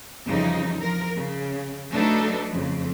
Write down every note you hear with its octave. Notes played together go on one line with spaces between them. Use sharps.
F2 C#3 E3 F3 G3 D#4
F3 A#4
C#3
F#3 A3 D4 D#4 A4 B4
F2 C#3